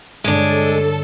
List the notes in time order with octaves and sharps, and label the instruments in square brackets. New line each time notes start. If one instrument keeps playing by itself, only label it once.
[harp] G2 D3 C#5 [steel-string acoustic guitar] G#3 D4 [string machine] A4